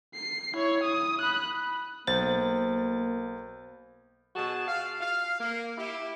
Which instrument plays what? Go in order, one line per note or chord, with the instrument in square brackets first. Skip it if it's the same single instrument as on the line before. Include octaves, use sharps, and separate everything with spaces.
[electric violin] C7
E4 C#5
D#6
B5 F#6
[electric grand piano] B1 A6 [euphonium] A#3 [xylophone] C5
[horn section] B2 F#4 G#4 A5
F5
F5
A#3
E4 G4